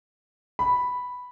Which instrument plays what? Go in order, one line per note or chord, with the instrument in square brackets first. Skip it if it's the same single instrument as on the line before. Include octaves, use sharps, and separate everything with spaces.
[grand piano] B5